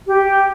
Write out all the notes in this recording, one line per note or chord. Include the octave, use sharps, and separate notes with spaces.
G4